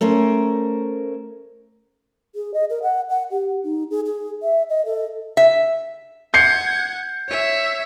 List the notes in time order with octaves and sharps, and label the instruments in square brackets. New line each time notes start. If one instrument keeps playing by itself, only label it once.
[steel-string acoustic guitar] A3 C#4 A#4 C5
[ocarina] G#4
D#5
A#4
F#5
F#5
G4
D#4
G#4
G#4
E5
D#5
A4
[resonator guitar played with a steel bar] E5
[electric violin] F#5 G#6 [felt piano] G6 C7 C#7
[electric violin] C#5 E5